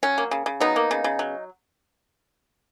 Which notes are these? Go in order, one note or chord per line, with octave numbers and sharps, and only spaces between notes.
F#3 C#4
A#3
C#3
C#3
F#3 B3 D#4
A#3
C#3
C#3
F#3